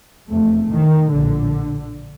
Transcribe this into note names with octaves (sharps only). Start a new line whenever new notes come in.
F1 E2 C3 A3
D#3
A#1 A2 D3